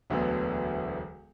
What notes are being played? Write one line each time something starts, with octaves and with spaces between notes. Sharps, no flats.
E1 D2 D3 F#3 B3